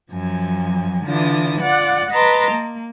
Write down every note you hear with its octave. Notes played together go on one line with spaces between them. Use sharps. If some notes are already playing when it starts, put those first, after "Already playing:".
F#2 F3 F#3 G#5
D3 E3 D4 F4 D#6
F4 D5 F#5 F#6
B4 D#5 A5 A#5 C6 D6
A#3